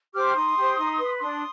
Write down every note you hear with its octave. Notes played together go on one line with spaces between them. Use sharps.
G4 C5 D6 F6
D#4 C6 D#6
G4 C5
D#4
B4
D4 C6 D#6